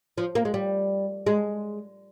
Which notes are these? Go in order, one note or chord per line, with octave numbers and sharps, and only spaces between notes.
F3
A#3
G#3
G3
G#3